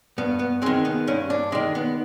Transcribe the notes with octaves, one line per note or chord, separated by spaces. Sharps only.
G2 B3
B3
D#3 G#3 C4
B3
G2 C#4
D4
D#3 G#3 D4
B3